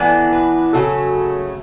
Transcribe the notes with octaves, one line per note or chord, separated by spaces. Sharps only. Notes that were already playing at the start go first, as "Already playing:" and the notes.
Already playing: E3 B3 D4 A4
B4
C#3 F#3 A3 A4